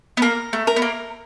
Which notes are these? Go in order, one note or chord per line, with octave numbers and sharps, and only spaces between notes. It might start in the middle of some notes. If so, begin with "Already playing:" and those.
B3
A#3 A#4
A3
A#4
B3
A#3